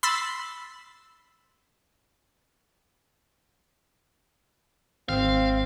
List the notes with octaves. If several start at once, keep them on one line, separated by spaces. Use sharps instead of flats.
B5 C6 E6 A6
G#1 C4 F5